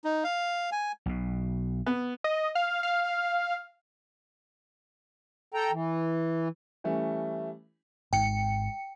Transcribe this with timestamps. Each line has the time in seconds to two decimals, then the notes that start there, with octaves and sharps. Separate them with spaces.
0.05 D#4
0.24 F5
0.72 G#5
1.06 B1 B2
1.86 B3
2.24 D#5
2.55 F5
2.83 F5
5.54 A4 G5 A#5
5.71 E3
6.84 E3 G3 A3 C#4
8.13 G#1 G#2 G5 C#7